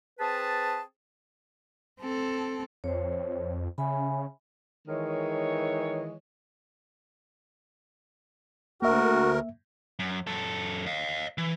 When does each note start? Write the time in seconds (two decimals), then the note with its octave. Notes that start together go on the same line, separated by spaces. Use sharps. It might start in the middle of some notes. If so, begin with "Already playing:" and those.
0.19 C4 G#4 B4 A5
2.00 C4 A4
2.84 F2 C5 C#5
3.78 C#3 E5 G#5 B5
4.88 D#3 E3 G#3 C#5
8.82 D2 A#3 F#4 A#4 E5
9.99 F#2
10.27 F#2 A4
10.86 D#5 F5
11.38 E3